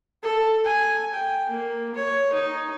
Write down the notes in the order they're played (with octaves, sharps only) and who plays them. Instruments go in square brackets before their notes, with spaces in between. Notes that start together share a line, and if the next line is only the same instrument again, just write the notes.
[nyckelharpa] A4
G#5
G5
A#3
C#5
D#4